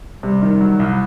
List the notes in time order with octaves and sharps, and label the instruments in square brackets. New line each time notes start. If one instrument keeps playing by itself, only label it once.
[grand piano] C3 [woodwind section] G3
[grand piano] D#3
F#3
C2